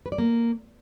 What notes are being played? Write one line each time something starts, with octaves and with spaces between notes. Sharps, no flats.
B4
D5
A#3